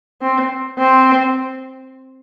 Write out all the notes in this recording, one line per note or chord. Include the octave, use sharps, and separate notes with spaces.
C4
C4